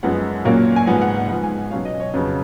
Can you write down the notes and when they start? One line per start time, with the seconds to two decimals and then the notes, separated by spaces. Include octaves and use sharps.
0.03 F#2 F3 G#3 B3 F#5
0.45 A#2 F#3 A#3 C#4
0.76 G#5
0.87 G#2 F3 B3 F#5
1.02 F#5
1.15 F#5
1.29 G#2 F3 B3 F#5
1.43 G#5
1.71 B2 F#3 C#4 F5
1.85 D#5
2.00 C#5
2.14 F2 C#3 F#3 B3